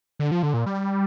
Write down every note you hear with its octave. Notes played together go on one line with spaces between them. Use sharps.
D3
F3
D3
A#2
G3